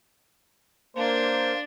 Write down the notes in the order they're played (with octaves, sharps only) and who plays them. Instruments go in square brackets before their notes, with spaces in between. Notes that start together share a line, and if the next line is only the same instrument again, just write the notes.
[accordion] A#3 [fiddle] D4 [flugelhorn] C5